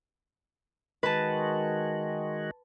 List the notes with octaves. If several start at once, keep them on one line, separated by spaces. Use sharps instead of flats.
D#3 G#3 F#4 B4 A5